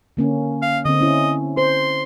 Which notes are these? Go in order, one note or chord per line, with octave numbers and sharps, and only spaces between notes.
D3 A#3 C#4
F5
D3 C4 D#5
C#4 E4
C5 C6